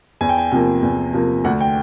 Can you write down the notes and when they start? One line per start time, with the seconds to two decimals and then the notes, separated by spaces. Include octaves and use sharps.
0.21 E2 G#5
0.29 G5
0.38 G#5
0.51 C3 F3 A#3 G5
0.82 E2
1.13 C3 F3 A#3
1.44 D2 F#5
1.61 G5